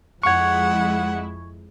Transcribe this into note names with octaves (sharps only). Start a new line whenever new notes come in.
F2 G#3 E4 F#5 C#6 G#6